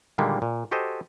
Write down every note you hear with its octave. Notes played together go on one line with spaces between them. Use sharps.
A#2 D3 D#3 G3 G#3 A#3
A#2
F#4 G4 A4 C5 D#5 G#5